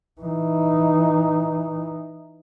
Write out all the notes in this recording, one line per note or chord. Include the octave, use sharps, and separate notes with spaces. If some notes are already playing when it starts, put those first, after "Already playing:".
E3 D#4